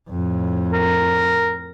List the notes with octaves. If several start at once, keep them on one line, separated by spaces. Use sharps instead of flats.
F2 A2
A#4